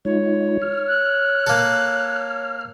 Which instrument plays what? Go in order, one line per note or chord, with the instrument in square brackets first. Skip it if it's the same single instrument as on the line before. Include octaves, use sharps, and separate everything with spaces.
[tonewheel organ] G#3 D#4 F4 [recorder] C#5
[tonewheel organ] F6
[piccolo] F#6
[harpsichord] A#3 A4